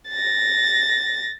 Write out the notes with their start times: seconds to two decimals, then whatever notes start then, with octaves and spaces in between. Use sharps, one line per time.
0.10 A6 A#6